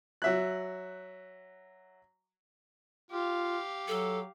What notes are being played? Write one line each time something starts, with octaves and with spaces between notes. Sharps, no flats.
F#3 E5 F#6
F4 G4 F5
F#3 A4